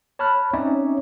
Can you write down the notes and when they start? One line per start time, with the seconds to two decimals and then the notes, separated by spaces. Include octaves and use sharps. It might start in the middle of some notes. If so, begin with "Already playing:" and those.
0.19 C#5 A5 B5 F6 F#6
0.53 C4 C#4 D#4 C#5 D5 E5